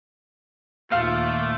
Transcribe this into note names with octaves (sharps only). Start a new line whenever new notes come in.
D#2 A#2 A3 F4 F5 D6